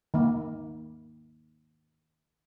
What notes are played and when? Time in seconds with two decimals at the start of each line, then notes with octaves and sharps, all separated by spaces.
0.14 D#3 A#3